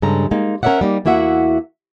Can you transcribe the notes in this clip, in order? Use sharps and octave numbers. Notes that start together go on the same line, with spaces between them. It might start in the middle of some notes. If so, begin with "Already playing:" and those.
G2 C#3 G#3 A4 A#5
G#3 A#3 D#4
C#4 A#4 C#5 D5 E5 F#5
G3 A#3 D#4
E2 A#3 E4 F#4 E5 F#5